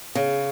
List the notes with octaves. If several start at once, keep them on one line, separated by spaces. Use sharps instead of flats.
C#3